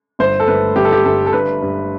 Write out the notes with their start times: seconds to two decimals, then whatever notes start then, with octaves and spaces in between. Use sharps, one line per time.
0.19 G1 C5
0.40 A4
0.47 G1 B4
0.76 G1 G4
0.85 A4
0.93 G4
1.05 G1 A4
1.26 A4
1.33 G2 B4
1.62 G2